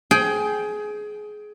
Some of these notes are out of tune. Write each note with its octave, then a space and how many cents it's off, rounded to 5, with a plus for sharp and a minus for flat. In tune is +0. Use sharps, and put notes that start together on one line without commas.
G#4 +20 G5 +0